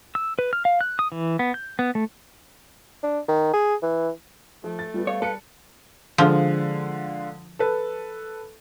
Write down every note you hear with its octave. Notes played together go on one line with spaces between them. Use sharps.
E6
B4
F6
F5
F#6
D#6
E3
B3
G6
B3
A3
D4
D#3
G#4
E3
F3 A3
A6
G3 B3 F4
C#5 F5
G3 A4 B4 C#7
D3 F3 G#3 F4
A4 B4